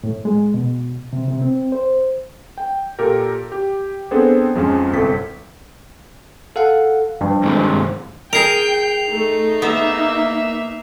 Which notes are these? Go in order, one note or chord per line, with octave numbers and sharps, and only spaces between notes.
A2
G#3
B2
C3
C3
C4
C5
G5
A#2 G4 A4 A#4
G4
B3 C4 D4 G#4 A4 C5
F2 G#2 F3 G#3 C#4
G1 C2 C4 A4 B6
A4 F5 F#5
G2 F3
G#2 C3 D#3
G#4 A#4 G5 C7 F7
A3 D#4
A#3 B3 E5